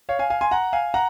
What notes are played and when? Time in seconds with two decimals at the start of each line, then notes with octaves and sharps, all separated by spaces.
0.09 C#5 F5
0.19 F5 G#5
0.30 F5 G#5
0.41 G#5 C6
0.51 F#5 A#5
0.73 F5 G#5
0.94 F#5 A#5